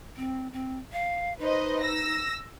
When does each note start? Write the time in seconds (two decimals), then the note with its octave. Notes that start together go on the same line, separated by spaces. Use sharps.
0.17 C4
0.53 C4
0.93 F5
1.39 D#4 B4 C5 D#5
1.82 E6 A#6